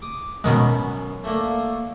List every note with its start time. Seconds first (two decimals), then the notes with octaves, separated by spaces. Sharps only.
0.02 D6 D#6
0.44 F#2 B2 D#3 G#3 B3
1.24 A3 A#3 D4